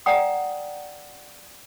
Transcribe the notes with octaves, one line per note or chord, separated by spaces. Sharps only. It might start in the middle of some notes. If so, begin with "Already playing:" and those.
D5 F#5 G5 A#5 D#6